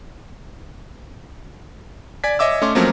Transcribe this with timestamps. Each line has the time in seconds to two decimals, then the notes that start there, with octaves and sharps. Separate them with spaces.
2.24 D5 G#5 G#6 B6
2.39 C#5 D#5 E5 D6 E6
2.62 A3 C#4 C6 D6
2.75 F3 F#3 A3 A#3 C4 C#4